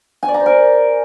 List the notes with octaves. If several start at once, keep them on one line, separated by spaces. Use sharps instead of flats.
G#5
D5
A#5
C5
A#4